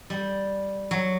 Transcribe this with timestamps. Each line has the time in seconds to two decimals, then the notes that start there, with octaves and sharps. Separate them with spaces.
0.10 G3
0.91 F#3